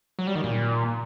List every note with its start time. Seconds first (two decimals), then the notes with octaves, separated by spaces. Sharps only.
0.19 F#3
0.27 G3
0.35 D#3
0.44 A#2